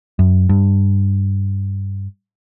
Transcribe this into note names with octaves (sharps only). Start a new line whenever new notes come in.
F#2
G2